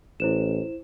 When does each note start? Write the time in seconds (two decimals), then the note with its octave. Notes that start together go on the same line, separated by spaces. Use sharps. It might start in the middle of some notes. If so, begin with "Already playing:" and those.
0.20 A1 E4 C5 E7